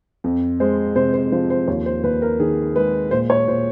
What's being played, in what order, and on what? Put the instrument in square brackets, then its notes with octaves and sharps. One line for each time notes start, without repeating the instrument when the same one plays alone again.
[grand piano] F2
G#3 C5
C3 C5
C5
F3 C5
C5
D#2 C#5
C5
D#2 B4
A#4
D#3 G#4
G#3 B4
A#2 C5
C#5
A#2 C5